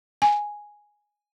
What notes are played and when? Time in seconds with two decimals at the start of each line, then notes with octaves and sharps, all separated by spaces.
0.22 G#5